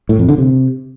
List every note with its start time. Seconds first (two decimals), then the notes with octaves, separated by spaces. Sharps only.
0.09 A2
0.19 F2
0.28 D3
0.38 C3